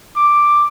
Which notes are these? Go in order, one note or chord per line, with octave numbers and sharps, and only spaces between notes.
D6